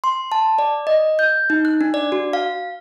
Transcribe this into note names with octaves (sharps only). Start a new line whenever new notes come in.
C6
A5
D5
D#5
G6
D#4
F#6
D4
D5
F#4
F5